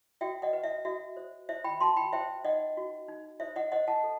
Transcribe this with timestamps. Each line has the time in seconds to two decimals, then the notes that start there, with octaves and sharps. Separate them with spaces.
0.21 F#4 E5 G5
0.42 D#5 F#5
0.53 B4
0.64 E5
0.85 F#4 E5
1.17 C5
1.49 C5 E5
1.64 G5 B5
1.81 F#4 A5 C6
1.97 G5 B5
2.13 C5 E5 G5
2.44 D#4 D#5 F#5
2.77 F#4
3.08 D#4
3.40 C5 E5
3.56 D#5 F#5
3.72 C5 D#5 F#5
3.88 F#5 A5
4.04 A4